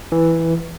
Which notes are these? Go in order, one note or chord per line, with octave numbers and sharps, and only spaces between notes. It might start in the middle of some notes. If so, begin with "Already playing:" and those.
E3